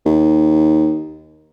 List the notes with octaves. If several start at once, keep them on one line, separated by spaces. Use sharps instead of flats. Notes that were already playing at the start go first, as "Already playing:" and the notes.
D#2